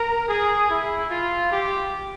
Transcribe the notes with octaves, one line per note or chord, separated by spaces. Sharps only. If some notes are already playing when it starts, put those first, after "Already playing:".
Already playing: A#4
G#4
E4
F4
G4